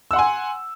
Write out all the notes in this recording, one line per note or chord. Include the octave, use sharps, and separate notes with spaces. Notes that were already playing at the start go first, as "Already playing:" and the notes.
F#5 G#5 C6 E6